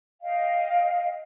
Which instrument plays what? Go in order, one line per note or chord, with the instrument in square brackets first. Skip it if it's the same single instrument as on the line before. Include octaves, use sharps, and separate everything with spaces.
[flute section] D#5 F5 G5